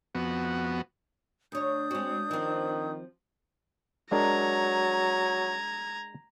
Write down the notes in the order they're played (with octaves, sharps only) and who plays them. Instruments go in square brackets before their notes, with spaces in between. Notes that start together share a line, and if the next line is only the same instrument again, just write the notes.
[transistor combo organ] F2 B3 F#4
[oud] D2 C#5 [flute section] D4 D#6 G6
[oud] G#3 F#4 [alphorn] C4
[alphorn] D#3 [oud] F3 C4
[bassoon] F#3 [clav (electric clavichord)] G#3 D4 A#4 [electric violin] A#5 G#6